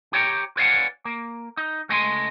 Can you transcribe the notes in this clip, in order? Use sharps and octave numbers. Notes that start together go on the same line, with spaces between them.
G4 C#5 G5 A5 A#5
B4 C#5 D5 F5 F#5 G#5
A#3
D#4
C#2 A3 D#5 G#5 B5 C6